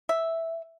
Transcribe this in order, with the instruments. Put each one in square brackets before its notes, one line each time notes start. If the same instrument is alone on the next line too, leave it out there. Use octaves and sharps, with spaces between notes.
[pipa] E5